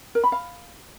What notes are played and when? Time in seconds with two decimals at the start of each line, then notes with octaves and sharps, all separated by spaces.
0.15 A#4
0.24 B5
0.32 F5